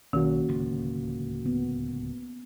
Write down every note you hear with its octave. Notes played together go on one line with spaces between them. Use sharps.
B1 D#3 A#3 C#4 F#4
D1 C#2 F3
B3